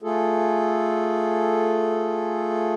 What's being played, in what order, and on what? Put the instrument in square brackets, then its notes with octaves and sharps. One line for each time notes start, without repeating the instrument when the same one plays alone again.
[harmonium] A3 F4 G#4 A4